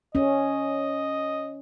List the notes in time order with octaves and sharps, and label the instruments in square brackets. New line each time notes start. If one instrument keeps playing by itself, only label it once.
[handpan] C#4 [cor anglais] D#5